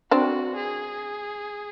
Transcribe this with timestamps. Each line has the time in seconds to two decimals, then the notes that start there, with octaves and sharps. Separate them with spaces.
0.11 C4 D4 F#4
0.57 G#4